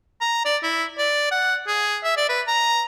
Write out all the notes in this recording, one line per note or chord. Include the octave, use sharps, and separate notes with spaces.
A#5
D5
E4
D5
F#5
G#4
E5
D5
B4
A#5